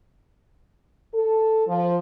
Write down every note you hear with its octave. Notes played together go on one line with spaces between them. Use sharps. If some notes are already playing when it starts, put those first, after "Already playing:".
A4
F3